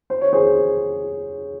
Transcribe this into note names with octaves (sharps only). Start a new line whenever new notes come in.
C5
C#5
G#4 C5